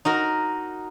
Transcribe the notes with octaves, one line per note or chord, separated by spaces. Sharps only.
D#4 F#4 A#4